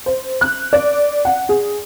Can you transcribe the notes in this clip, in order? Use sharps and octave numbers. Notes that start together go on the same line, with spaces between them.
C5
F#6
D5
F#5
G#4